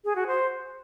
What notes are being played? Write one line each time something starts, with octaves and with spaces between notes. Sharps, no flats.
G#4
F#4
C5